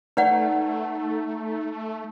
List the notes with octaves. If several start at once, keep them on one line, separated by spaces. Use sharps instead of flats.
A3 D#4 B4 D5 F#5